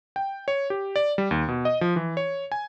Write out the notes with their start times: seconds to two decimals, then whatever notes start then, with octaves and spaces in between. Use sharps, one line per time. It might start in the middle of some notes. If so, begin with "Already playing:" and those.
0.16 G5
0.48 C#5
0.70 G4
0.96 D5
1.18 G3
1.31 D#2
1.48 B2
1.65 D#5
1.81 F3
1.96 E3
2.17 C#5
2.52 G#5